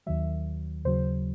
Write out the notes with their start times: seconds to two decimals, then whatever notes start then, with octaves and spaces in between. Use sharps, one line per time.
0.06 D#2 D#3 F#3 E5
0.85 D#2 C#3 F#3 C5